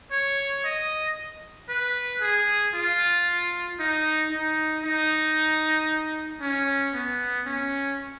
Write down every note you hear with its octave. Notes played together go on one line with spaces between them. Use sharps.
C#5
D#5
B4
G#4
F4
D#4
D#4
D#4
C#4
B3
C#4